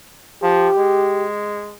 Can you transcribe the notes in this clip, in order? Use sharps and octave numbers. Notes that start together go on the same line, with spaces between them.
F3 G4
G#3